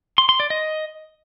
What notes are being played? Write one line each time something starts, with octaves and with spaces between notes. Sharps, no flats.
C6
C6
D5
D#5